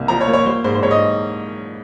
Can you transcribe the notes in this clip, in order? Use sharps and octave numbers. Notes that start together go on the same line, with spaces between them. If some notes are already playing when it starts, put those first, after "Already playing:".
Already playing: C2 A#3
F3 A#5
C#5
A#3
C#5
G3 C5
G#2 C5
C5
G#2 C#5
D#5